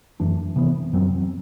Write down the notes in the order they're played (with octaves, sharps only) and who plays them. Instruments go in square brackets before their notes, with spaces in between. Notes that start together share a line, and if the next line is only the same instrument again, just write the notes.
[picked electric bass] F#2 E3 A3 D4
C3 E3 B3
F#2 F#3 C4